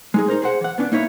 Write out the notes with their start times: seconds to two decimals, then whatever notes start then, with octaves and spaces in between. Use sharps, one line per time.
0.14 G#3 D#4 G#4
0.28 D#4 A#4 C5
0.42 G#4 C5 F#5
0.61 E3 F#5
0.78 B3 C#4 D4
0.92 A#3 D#4 E4 C#5